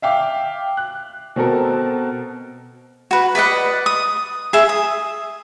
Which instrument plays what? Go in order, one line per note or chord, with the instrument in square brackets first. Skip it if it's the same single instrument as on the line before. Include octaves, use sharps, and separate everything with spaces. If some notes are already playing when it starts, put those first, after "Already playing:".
[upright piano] E5 F5 G5 D6
F#6
B2 C4 A4 A#4
[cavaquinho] F#4 B4
B4 D5 D#5 F#5
D#6
G#4 E5
D#6